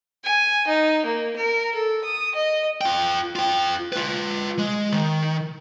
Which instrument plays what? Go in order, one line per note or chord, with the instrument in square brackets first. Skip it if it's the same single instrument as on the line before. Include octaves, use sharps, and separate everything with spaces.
[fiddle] G#5
D#4
A#3
A#4
A4
D#6
D#5
[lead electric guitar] F4 G5
F4 G5
F4 B4
G#3
D#3